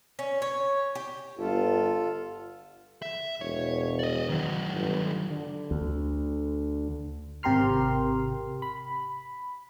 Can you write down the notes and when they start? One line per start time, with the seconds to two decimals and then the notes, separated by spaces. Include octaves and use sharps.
0.19 C#4
0.42 C#5
0.95 G4
1.38 G1 F4 A4
3.02 E5
3.41 E1 C#5
3.99 D5 D#5
4.29 D#3 F#3
4.74 G1
5.29 D3
5.71 D2
7.43 G#1 C3 G4 A#4 C6 F6
8.62 B5